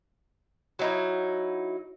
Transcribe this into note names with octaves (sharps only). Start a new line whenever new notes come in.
F#3 D#4 E4